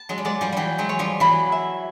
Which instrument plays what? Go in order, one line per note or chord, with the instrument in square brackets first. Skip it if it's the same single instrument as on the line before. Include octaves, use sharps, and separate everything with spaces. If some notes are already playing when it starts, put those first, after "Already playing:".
Already playing: [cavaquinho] A5
[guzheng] F#3 G#3
G3
[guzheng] F#3 G#3 [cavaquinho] D5
[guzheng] F3 G3
[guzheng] E3 F#3 G3 [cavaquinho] G5
[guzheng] F#3 G#3
[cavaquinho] C#5
[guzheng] F3 G3
[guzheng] E3 F#3 [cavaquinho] B5
[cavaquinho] E5